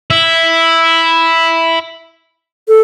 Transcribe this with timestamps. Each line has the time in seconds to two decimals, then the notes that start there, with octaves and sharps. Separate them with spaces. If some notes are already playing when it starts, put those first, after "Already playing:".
0.10 E4
2.68 A4